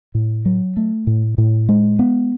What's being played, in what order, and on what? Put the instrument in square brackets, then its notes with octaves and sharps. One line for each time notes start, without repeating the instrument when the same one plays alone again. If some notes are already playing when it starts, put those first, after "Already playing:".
[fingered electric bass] A2
F#3
A3
A2
A2
G#3
B3